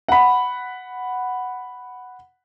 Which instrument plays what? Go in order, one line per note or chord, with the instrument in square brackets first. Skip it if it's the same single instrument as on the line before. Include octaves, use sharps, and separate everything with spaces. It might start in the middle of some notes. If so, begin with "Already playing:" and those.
[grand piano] F#5 B5